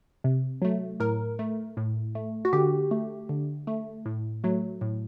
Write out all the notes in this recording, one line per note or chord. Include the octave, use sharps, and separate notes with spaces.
C3
F#3 A3
A2 A#4
A3
A2
A3
F#4
D3 G4
A3
D3
A3
A2
F#3 A3
A2